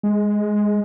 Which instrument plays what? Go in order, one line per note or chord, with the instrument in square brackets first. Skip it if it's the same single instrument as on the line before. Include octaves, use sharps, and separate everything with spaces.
[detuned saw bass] G#3